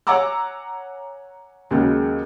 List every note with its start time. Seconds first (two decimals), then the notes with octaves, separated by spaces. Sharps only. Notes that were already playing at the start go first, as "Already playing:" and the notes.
0.07 C#5 F#5 G#5 A#5 D6 E6
1.71 D#2 C#3 F#3 G#3